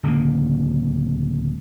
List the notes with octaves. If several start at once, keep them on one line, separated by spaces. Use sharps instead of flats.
D1 C#2 D3 A#3